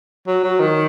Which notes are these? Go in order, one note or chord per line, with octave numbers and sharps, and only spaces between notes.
F#3
F#3
D#3